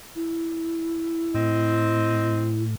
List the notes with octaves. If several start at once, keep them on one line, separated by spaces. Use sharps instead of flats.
E4
A2 C4 D#5